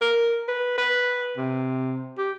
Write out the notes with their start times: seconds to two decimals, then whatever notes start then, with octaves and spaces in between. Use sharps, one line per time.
0.01 A#4
0.48 B4
0.78 B4
1.37 C3
2.18 G4